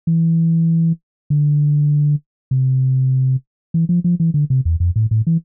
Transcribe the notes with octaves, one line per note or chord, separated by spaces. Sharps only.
E3
D3
C3
E3
F3
F3
E3
D3
C3
E2
F2
A2
A2
E3